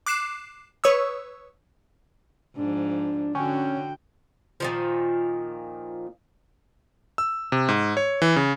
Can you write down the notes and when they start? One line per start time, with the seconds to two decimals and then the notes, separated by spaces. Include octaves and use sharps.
0.06 D6 F#6 C7 E7
0.84 B4 C#5 C#6 D#6 E6
2.56 G#2 F3 D4
3.35 D3 C#4 F#4 G5
4.60 A#2 D#3 F3
7.18 E6
7.52 C3
7.69 G#2
7.97 C#5
8.22 E3
8.36 C#3